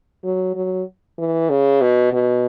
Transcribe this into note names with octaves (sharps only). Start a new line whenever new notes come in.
F#3
F#3
E3
C#3
B2
B2